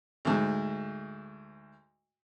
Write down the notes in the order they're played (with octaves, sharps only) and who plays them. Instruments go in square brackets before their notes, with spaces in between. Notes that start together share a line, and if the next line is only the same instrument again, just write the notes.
[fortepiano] D2 G#2